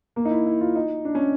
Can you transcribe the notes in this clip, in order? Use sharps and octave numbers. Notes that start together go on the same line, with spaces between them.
A#3
D#4
E4
E4
F4
D#4
D4
C#4